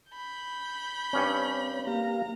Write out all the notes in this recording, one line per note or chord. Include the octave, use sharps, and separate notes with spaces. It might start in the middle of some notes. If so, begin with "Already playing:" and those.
B5 G6
G2 C4 C#4 C#5
A#3 G4 F5 A#5